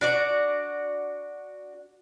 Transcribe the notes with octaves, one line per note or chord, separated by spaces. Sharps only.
D4 F#4 D5